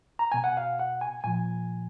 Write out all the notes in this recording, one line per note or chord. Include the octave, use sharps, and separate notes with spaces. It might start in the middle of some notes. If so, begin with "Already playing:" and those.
A#5
B2 G#5
F#5
F5
F#5
G#5
A#2 F3 G#5